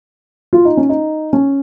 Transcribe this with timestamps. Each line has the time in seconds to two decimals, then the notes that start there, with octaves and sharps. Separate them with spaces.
0.53 F4
0.65 D#4
0.77 C#4
0.89 D#4
1.33 C#4